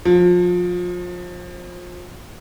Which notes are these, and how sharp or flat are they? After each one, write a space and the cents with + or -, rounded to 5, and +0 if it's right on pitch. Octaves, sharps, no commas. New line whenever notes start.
F3 +30